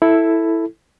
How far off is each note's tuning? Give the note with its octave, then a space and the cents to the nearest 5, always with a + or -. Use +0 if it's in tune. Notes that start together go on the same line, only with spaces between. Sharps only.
E4 +0 A4 +5